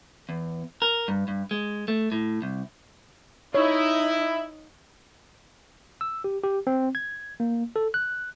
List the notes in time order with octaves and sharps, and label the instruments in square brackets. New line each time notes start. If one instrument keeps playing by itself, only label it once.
[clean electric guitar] E2
A#4
G2
G2
G#3
A3
A2
C2
[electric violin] D#4 D#5 [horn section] E4 [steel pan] C#5
[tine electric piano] E6
G4
G4
C4
G#6
A#3
A4
F#6